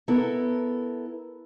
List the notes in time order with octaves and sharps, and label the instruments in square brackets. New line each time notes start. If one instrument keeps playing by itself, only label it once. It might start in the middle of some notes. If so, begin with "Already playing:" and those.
[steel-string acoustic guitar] B3 E4 A4 A#4